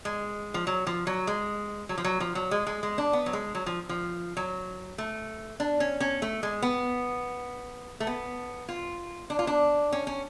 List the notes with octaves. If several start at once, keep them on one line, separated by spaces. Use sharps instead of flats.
G#3
F3
F#3
F3
F#3
G#3
F#3
F3
F#3
F3
F#3
G#3
G#3
G#3
D4
B3
F#3
G#3
F#3
F3
F3
F#3
A3
D4
C#4
C#4
A3
G#3
B3
A3
B3
F4
D4
F4
D4
C#4
C#4